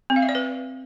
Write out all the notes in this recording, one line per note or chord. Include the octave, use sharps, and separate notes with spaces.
C4
F5
E5
D5
B4